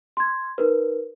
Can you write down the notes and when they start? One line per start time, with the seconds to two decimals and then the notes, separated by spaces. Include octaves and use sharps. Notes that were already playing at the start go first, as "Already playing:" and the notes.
0.17 C6 G#6
0.58 D#4 A#4 B4